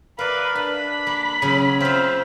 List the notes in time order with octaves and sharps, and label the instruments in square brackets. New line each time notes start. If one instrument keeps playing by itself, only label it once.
[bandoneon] A#4 F5 B5 [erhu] B4 [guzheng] D5 E5
[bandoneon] D4 [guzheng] A5 [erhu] B5
[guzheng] A#3
C#3 F#3
[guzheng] C4 F4 [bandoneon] C5 E5 F5